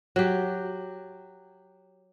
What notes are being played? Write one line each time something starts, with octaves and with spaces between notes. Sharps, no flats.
F#3 G4